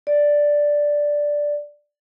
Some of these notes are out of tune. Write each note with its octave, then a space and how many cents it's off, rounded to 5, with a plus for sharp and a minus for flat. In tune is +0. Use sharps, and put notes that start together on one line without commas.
D5 +0